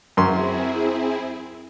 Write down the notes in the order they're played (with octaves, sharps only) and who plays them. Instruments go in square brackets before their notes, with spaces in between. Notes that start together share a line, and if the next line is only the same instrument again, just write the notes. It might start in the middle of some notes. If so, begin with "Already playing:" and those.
[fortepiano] F#2 C6 [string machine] C4 E4 G#4